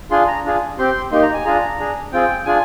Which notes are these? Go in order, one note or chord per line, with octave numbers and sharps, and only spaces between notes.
D4 F4 G#4 C6
A#5
D4 F4 G#4
C4 G4 C6
A#3 D#4 G4 C6
A#5
G#5
D4 F4 G#4 A#5
D4 G#4
C4 F4 G#4 G5
D4 F4 G#4 G#5